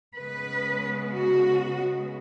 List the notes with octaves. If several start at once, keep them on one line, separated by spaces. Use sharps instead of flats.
C#3 G#3 B3 B4
F#4